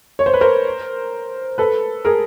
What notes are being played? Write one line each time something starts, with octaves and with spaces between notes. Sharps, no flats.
C#5
C5
B4
A#4 C5
A4 B4
G#4 A#4